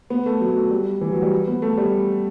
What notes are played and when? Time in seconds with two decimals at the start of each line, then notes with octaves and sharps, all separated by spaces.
0.10 B3
0.26 A3
0.41 F#3
0.56 A3
0.71 G3
1.01 E3
1.12 F#3
1.22 G3
1.47 B3
1.62 A3
1.77 G3